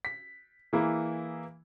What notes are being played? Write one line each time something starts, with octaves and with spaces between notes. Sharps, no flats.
B6
E3 A#3 E4 G#4